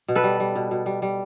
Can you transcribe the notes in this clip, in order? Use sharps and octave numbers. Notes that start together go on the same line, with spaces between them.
B2
A4 B4
G3
G3
B2
B2
G3
G3